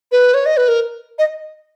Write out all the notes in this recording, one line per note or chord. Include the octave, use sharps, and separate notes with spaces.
B4
C#5
D#5
B4
A#4
D#5